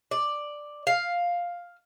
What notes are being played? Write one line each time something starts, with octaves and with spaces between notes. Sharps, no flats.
D5
F5